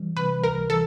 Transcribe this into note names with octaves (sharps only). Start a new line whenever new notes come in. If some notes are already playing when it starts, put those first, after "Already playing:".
Already playing: E3 G3
C3 B4
C#2 A#4
E3 A4